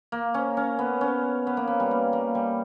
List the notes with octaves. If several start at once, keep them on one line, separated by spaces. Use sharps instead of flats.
A#3
C#4
C#4
B3
C#4
B3
A#3
B3
G3
A#3
A#3
G3